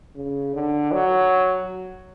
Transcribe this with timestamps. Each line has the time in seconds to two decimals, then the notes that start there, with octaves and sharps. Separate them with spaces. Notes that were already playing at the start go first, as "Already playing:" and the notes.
0.15 C#3
0.55 D3
0.92 F#3